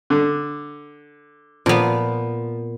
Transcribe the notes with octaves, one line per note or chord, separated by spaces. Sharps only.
D3
A#2 F3 B3